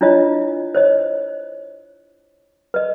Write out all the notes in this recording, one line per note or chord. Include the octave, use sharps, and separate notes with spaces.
D4 E4 F4 C#5 D#5
C5 C#5 D#5
B4 D#5